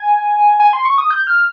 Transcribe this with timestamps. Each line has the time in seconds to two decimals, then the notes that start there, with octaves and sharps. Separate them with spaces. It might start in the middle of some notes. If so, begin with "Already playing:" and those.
Already playing: G#5
0.60 G#5
0.73 C6
0.85 C#6
0.98 D#6
1.10 G6
1.27 F6